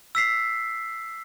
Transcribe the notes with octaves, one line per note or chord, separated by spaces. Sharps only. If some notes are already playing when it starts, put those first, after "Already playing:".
E6 B6 C7